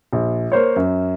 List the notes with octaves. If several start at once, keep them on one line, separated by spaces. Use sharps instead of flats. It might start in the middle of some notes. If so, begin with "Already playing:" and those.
A#1
A#3 C5 C#5
F#2